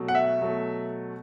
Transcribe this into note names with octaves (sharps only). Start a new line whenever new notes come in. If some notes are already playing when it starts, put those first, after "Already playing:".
Already playing: B2 F#3 A3
F#5
E5
B2 F#3 A3